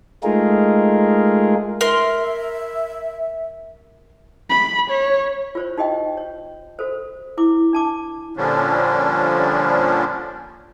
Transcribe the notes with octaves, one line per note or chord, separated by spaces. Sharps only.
G#3 A3 D#4 F4 G#4 A#4
A#4 E5 C6
B5
C#5
F4 C5 C#5
D#4 F#4 G4 D#5 G5
C#5
F#4 A4 C5
E4 D6
D4 A5 D6
A#2 D3 F3 G3 C#4 D4